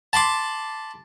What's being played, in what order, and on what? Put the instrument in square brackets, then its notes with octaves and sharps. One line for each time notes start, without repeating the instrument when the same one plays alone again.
[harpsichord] A5 B5 C6 D6